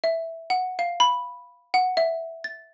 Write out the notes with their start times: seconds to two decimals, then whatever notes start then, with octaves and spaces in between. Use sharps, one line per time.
0.04 E5
0.50 F#5
0.79 F5
1.00 B5
1.74 F#5
1.97 E5
2.44 A6